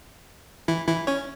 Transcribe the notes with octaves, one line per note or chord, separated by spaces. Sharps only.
E3 E4
E3 E4
C#4 C#5